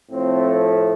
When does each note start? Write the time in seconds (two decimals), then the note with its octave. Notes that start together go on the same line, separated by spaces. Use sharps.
0.11 A2 F3 A3 C4